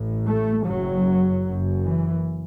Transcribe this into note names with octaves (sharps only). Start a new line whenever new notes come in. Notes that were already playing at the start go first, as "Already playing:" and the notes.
Already playing: A1 A2
A3
F#1 F#2 F#3
F#1 F#2
E3